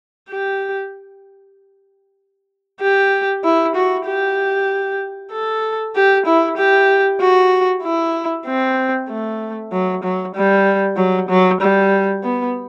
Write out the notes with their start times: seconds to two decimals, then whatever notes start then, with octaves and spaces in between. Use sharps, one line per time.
0.30 G4
2.81 G4
3.44 E4
3.75 F#4
4.07 G4
5.32 A4
5.95 G4
6.26 E4
6.57 G4
7.21 F#4
7.83 E4
8.47 C4
9.09 A3
9.72 F#3
10.03 F#3
10.35 G3
10.97 F#3
11.29 F#3
11.61 G3
12.24 B3